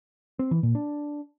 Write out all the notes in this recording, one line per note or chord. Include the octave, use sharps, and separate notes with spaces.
C4
E3
A#2
D4